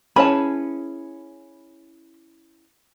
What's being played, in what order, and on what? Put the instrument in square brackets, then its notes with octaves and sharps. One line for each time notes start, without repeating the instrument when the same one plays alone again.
[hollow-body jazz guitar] C#4 G#4 B4 [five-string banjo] E4 C#5 A5 [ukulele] B5